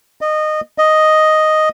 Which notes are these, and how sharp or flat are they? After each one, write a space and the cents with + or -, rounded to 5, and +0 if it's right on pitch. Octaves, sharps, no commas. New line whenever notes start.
D#5 -20
D#5 +0